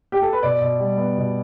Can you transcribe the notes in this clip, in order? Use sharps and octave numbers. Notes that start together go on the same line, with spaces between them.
G4
A4
B4
B2 D5
B2
G3
B3
B2